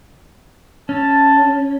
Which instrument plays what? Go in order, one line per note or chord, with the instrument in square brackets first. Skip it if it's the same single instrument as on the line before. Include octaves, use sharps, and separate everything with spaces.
[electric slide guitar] C#4 [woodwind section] A5